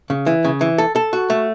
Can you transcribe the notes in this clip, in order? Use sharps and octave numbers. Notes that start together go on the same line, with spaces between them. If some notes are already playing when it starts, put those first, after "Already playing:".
C#3
E3
C#3
E3
A4
A4
F#4
A3